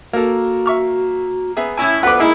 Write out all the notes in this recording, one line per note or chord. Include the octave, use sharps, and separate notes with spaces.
A#3 F#4 A4 A#4
E5 C#6 F6
B3 G#4 E5
A2 C#4 E4 G#5
D2 B3 F4 B4 F#5 D6
G#3 A#3 D#4 E4 G#4